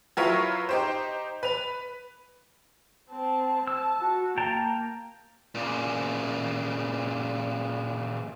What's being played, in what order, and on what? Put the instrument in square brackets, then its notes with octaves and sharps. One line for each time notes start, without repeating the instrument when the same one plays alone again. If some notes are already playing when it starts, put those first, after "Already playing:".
[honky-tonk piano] F#3 E4 F4 A#4 B4 C#5
D#4 G4 C5
B4 F7
[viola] C4 A5
[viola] A5 [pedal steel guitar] E6
[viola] F#4
[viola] A#3 [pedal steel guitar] G5 A5 A#5
[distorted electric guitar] A#2 C#3